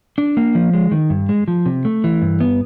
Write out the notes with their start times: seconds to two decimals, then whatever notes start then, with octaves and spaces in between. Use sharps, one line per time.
0.18 D4
0.37 A#3
0.55 F3
0.73 G#3
0.91 D#3
1.10 G2
1.29 G#3
1.48 F3
1.66 C3
1.85 A3
2.04 E3
2.22 G2
2.40 B3